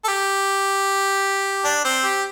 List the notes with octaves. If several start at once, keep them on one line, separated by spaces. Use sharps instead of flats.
A4
G4
D4
C4
G4